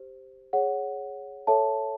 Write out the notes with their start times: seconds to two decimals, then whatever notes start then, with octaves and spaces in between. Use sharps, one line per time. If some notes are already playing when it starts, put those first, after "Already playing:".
Already playing: G4 C5
0.53 G#4 C#5 F#5
1.47 A4 C#5 E5 A5